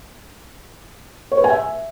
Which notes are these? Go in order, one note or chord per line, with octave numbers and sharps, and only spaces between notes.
C#5
B4
G#5
E5